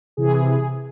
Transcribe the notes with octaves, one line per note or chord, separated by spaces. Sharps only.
C3 E3 G#4